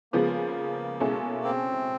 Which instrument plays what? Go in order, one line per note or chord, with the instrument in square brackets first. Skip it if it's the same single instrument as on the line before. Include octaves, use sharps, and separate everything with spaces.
[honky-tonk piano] C#3 F3 G#3 B3 [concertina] A#3
[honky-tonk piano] B2 G#3 C#4 E4 A4
[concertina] C4